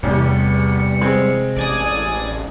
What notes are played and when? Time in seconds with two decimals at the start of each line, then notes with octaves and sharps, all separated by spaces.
0.03 A1 E2 C3 G3 C#7
1.01 G#3 C4
1.56 A1 D5 G#5 D#6